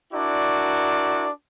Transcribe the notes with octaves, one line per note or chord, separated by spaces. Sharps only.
D4 E4 F#4 A#4 D5